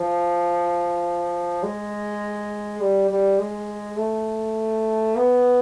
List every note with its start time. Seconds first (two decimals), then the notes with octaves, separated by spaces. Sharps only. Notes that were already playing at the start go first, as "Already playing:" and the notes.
Already playing: F3
1.63 G#3
2.81 G3
3.11 G3
3.39 G#3
3.98 A3
5.16 B3